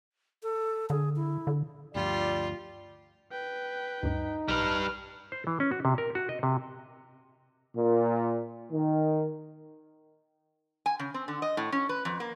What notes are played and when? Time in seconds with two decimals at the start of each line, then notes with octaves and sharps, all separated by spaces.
0.43 A4
0.90 D3 G#4
1.16 E4
1.47 D3
1.95 D2 G2 F3 G3 F4 D5
3.32 B4 G5
4.03 D2 G2 D#4
4.48 B1 G3 B4 F6
5.32 C5
5.47 E3
5.60 C#4
5.71 F#4
5.85 C3
5.98 A#4
6.15 F#4
6.29 D#5
6.43 C3
7.76 A#2
8.72 D#3
10.86 G#5
10.99 C#3
11.14 C4
11.28 D3
11.42 D#5
11.57 A2
11.72 C#4
11.89 B4
12.05 F2
12.20 A#3